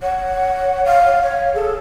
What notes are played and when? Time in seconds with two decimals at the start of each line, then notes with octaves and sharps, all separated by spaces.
0.02 C#5 F#5
0.85 F5
1.22 C#5
1.54 G#4 A4